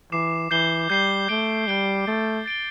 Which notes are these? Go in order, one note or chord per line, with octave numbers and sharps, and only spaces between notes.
E3 D6 C7 E7
E3 G6 C7 G7
G3 G6 C7 G7
A3 G6 D7 G7
G3 G6 D7 G7
A3 A6 D7 G7
A6 D7 G7